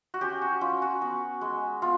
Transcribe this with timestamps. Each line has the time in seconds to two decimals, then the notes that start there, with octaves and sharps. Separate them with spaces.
0.14 F#4
0.21 C#4 G4
0.42 F#4
0.61 C#4 F4
0.82 F#4
1.02 B3
1.41 G#3
1.82 B3 F4